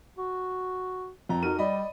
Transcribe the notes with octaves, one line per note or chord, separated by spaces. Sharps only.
F#4
F2 A#5
D#4 F#4 A#4 D#7
G3 D5 D#5 B5